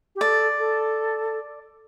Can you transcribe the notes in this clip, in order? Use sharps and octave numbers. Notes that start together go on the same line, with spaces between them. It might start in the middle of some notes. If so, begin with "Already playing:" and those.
G4
A4 D5
A4